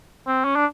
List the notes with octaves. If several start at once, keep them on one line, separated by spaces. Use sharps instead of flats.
C4
C#4
D4